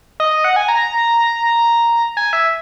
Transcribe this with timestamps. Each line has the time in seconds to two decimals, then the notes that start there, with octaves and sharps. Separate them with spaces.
0.20 D#5
0.31 D#5
0.44 F#5
0.56 G#5
0.68 A#5
2.17 G#5
2.33 E5